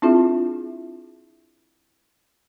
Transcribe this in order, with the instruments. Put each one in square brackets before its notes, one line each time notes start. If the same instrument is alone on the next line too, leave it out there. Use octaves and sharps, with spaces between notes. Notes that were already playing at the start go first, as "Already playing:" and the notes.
[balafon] C4 D4 E4 F4 G#4 E5